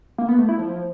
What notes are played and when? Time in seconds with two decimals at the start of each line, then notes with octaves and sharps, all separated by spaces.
0.18 A#3
0.29 B3
0.39 A3
0.49 E4
0.59 F3